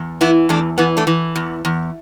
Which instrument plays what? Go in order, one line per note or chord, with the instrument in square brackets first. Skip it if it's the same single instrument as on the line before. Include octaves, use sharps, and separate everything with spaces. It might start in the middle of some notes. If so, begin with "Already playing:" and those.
Already playing: [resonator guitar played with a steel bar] E2
E3 B3 E4
E2 A3 D4
E3 B3
A3 D4
E3
E2
E2